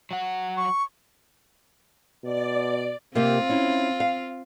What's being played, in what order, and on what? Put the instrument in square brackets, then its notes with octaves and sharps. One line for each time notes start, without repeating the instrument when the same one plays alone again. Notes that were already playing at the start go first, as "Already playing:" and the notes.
[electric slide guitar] F#3 F#5
[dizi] C#6
[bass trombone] B2 [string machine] D5
[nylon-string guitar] C3 A#3 G4 [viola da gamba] C4 F4
[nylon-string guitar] C#4 E4
F5